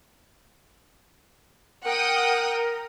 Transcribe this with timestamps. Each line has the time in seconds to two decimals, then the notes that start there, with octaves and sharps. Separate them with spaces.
1.86 A#4 F#5 G5 D#6